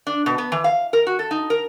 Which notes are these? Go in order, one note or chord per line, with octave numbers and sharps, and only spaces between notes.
D4
B2
B3
E3
F5
A#4
F#4
A4
D#4
A#4